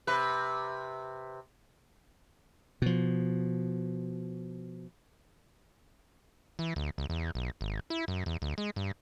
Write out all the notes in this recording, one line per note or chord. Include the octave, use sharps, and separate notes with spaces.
C3 B4
B2 F3
E3
D2
C#2
E2
B1
G#1
E4
F#2
E2
D2
G#3
G2